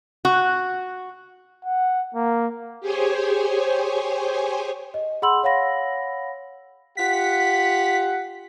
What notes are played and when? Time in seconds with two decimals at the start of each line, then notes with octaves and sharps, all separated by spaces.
0.25 F#4
1.65 F#5
2.15 A#3
2.80 G4 G#4 C5 C#5 G#5
4.94 D#5
5.22 G#4 F#5 B5 C6 E6 F#7
5.43 C#5 F5 F#5 B5 A#6
6.97 F4 G4 F#5 B6